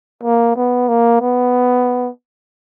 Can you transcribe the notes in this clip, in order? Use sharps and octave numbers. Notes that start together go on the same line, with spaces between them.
A#3
B3
A#3
B3